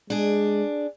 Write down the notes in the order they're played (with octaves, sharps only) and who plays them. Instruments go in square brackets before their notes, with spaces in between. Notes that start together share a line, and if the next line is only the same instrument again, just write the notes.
[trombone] G#3 [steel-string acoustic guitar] D4 G#4